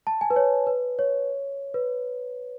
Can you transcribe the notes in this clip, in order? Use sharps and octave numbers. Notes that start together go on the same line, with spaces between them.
A5
G#5
B4
C#5
B4
C#5
B4